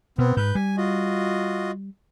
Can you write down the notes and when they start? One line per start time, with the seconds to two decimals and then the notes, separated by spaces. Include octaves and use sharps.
0.18 B2 B3 C4
0.37 G#2 B4 G6
0.55 G3 G#5
0.77 F4 F#4 D#5